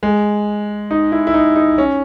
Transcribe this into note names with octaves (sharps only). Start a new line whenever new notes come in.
G#3
D#4
E4
E4
D#4
D#4
C#4